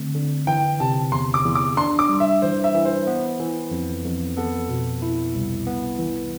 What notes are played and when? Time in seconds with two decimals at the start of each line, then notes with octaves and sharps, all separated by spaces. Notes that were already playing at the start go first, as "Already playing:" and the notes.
Already playing: D3 A3 C4
0.14 D3
0.47 E3 G5
0.80 C3 A5
1.12 E2 C6
1.34 D6
1.44 E2
1.55 D6
1.77 D4 C6
1.99 D6
2.09 G3
2.20 E5
2.42 E3 C5
2.64 E5
2.74 E3
2.85 C5
3.07 B3
3.40 E3
3.71 F2
4.04 F2
4.37 B3 A4
4.70 B2
5.02 E4
5.35 C2
5.67 B3
5.99 E3